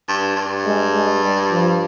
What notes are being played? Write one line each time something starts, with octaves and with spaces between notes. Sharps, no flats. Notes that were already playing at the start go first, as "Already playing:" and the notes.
G2
G2
G#3
G#3
G3
F3